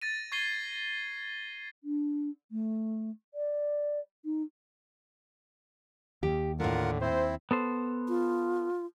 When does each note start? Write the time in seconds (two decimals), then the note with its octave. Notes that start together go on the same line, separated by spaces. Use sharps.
0.02 A6 A#6 D#7
0.32 C#6 G#6 C7 D#7 G7
1.83 D4
2.51 A3
3.34 D5
4.25 D#4
6.23 D#2 G4
6.60 A2 D3 A3 F4 A#4 F#5
7.01 C4 E4 C5
7.51 B3 A4 C5
8.09 F4